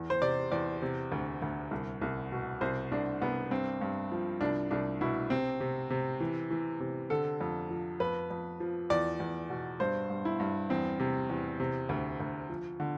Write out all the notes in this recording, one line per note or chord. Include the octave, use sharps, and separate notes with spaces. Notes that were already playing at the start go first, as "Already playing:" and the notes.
Already playing: E2
C5
C3 D5
E2 D5
C3
D2
D2
C2
C2
B2
C2 C5
C2 D4
C2 B3
G2 C4
G2
F3
C2 D4
C2 D4
B2 E4
C3 C4
C3
C3
E3
E3
C3
D3 A4
F2
F3
F2 B4
F2
F3
E2 D5
E2
B2
G2 C5
G2
E4
G2
E2 C4
C3
E2
C3
D2
D2
F3
D3